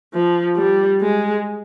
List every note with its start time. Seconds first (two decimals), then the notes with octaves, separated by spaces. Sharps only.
0.14 F3
0.57 G3
1.01 G#3